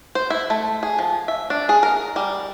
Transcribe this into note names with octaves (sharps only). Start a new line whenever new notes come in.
C5
E4
A3
G#4
F3
E5
D4
G#4
A#4
G3